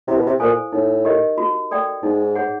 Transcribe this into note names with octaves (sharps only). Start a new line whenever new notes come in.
C3 E4
B2
C3
A#2 A4 C5 F5 G#5
A2 D#4
G4 A#4 D#5
F#4
A4 D5 G5
G#2 D#4
G#4 C#5 F#5